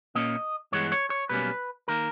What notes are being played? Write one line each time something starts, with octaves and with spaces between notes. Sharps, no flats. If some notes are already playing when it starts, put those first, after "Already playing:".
A#2 A#3 C#4 D#5
G2 E3 G#3 B3 C#5
C#5
C#5
B1 B2 G3 A#3 C#4 B4
D#3 A#3 A#4